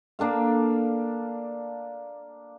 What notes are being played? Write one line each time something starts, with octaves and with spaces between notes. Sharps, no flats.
A#3 D4 A4 F5